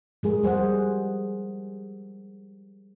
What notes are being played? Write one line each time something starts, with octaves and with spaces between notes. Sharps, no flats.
F3 G#3 G#4 A#4
G3 G#4 C5 F#5